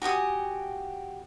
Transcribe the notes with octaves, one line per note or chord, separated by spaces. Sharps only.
F#4 G4 G#5 D#6